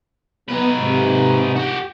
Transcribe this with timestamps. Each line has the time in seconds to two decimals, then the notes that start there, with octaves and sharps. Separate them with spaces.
0.49 B3 D#4 B4
0.80 G#2 C3
1.56 F#4 G4